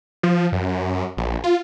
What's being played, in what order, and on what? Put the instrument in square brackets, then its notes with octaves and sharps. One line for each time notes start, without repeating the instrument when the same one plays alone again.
[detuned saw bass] F3
F#2
A#1
F4